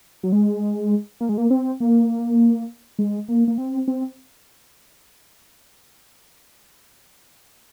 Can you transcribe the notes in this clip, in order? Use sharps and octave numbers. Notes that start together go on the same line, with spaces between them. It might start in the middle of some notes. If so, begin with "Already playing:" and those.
F#3
G#3
A#3
G#3
A#3
C4
A#3
G#3
A#3
A#3
C4
C4